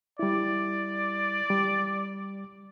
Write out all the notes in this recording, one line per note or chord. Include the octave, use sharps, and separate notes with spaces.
G3 E4 D5
G3